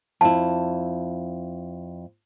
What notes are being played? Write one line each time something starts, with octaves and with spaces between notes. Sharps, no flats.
F2 E4 A5